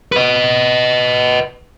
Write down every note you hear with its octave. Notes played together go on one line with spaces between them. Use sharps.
B4 D#5